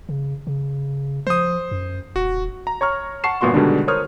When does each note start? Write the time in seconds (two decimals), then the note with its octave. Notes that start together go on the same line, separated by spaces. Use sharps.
0.09 C#3
0.47 C#3
1.27 F3 C5 D#6
1.71 F#2
2.16 D#1 F#4
2.67 A#5
2.81 C#5 A#5 C#6 F6
3.24 F#5 A5 C#6 C7 E7
3.41 G1 A#2 B3 F#4 C6 C#6
3.54 B2 D3 D#3 G3 G#3 D4
3.88 A#4 C5 C#5 D#6 F6